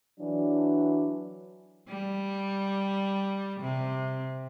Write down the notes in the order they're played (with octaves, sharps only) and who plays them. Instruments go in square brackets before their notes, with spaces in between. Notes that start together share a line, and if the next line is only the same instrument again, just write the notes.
[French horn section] E3 F#3 D4
[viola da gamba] G3
C3